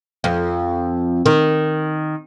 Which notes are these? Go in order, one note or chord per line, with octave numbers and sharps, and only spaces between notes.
F2
D#3